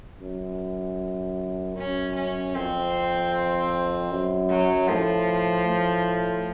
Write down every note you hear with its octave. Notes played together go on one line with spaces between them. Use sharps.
F#2
F#2 C#4
C#4
F2 C4
F#2
F#3
A2 F3
A2